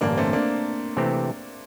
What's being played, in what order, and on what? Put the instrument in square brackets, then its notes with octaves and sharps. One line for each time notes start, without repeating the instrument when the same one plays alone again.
[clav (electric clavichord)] A1 G2 D3 [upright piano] A#3 D4
[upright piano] A3 C4
A#3 D4
[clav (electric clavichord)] C3 E3 A3 C4 G4